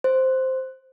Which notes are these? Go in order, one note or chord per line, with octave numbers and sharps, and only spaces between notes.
C5